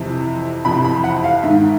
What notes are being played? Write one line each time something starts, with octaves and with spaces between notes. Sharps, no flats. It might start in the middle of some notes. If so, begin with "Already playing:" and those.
Already playing: F2 C3 E3
F2 C3 E3 B5
B5
F#5
F5
G#2 D#3 E5